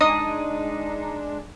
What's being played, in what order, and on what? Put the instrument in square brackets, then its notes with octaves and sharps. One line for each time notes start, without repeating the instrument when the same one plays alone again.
[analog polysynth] G#3 D4 [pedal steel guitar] D#4 [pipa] D#5